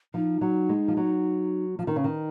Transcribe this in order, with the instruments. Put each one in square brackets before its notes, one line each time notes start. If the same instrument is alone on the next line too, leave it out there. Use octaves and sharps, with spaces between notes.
[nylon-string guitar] F3 [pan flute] D#4
[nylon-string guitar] F#3
G#3
F3
F#3
F3
D#3
C#3
D#3